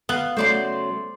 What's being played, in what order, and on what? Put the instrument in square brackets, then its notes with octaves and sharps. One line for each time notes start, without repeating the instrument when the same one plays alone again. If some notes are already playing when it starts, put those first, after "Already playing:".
[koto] B3 [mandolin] F5
[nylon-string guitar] C#3 F#3 A3 [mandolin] C5 D5 C6